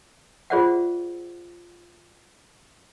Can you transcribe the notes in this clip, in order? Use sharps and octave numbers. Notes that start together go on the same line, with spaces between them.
F4 G#4 C5 D5 E5 F#5